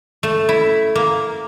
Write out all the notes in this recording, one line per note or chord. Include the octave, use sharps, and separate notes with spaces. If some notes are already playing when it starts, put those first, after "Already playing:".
A3
E4
A#3